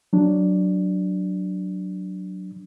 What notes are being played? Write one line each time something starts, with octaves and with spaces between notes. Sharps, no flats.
F#3 D4